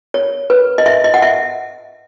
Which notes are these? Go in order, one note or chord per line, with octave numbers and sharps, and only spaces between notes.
C#5
B4
D#5
E5
D#5
F#5
E5